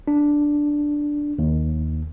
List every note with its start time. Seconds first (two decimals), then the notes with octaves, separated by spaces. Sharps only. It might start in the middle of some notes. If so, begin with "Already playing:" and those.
0.08 D4
1.39 D#2